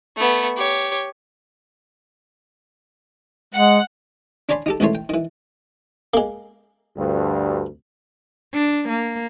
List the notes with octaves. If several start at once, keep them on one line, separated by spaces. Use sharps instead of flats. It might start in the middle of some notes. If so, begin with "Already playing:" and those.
A3 B3
G4 C#5
G#3 F#5
D4 C#5 D5 G#5 B5 C6
D#4 G4 A4
C#2 D#3 E3 A3 C#5 C6
G5
D#3 E3
G#3 A#3
D2 G2
D4
A#3